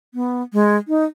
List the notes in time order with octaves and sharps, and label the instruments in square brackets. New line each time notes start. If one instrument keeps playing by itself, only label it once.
[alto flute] B3
G#3
D#4